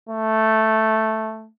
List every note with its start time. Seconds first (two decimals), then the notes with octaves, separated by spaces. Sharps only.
0.09 A3